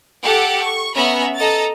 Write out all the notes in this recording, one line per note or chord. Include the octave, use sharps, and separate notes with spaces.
G4 A4 F#5 A5
C#6
B3 C#4 E5 A#5 B5
A4 D#5 A#5 A6